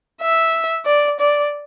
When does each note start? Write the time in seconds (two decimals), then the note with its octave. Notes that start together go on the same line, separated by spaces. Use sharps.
0.22 E5
0.86 D5
1.20 D5